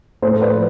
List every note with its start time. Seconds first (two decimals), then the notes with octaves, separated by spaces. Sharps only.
0.22 A2 A4 C5
0.41 B4 D5
0.51 F3